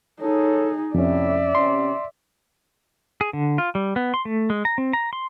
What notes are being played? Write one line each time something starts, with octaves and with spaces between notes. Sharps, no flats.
D#4 G#4 A4 C#5
F2 A2 C3 C#4 D5 E5
C3 C#4 C6
G#4
D3
F4
G3
B3
C6
A3
G#3
A#5
C4
A#5
C6